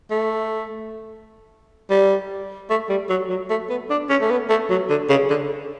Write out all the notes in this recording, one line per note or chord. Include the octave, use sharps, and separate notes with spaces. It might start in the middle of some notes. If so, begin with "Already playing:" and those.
A3
G3
A3
G3
F#3
F#3
A3
B3
D4
C#4
A3
B3
A3
F#3
D3
C#3
D3